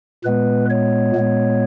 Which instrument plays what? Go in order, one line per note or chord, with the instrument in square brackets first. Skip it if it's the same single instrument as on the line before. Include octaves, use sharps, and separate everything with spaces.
[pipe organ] A#2 G#3 B3 B4
C#5
A#2 G#3 B3